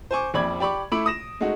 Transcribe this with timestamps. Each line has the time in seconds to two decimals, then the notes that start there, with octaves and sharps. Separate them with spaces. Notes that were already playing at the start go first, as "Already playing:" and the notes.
0.11 C5 G#5 C#6 D6
0.34 A#1 F2 D5 B5 D6 G#6
0.60 G4 D5 B5 C#6 D6
0.92 A3 E4 B5 D6 D7
1.06 D#6 A#6 E7
1.41 G#3 A3 D#4 F#4